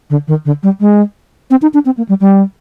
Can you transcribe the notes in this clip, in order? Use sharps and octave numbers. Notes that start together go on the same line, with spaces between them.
D3
D#3
D3
G3
G#3
C4
D#4
D4
C4
A#3
G3
G3